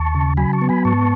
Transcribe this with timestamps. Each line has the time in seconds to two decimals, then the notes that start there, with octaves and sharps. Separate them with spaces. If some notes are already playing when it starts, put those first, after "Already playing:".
Already playing: D#2 A5 C#6
0.15 C#3
0.37 F#3 G#5 B5
0.53 A5 C#6
0.62 B3
0.69 G#5 B5
0.85 G#2 A5 C#6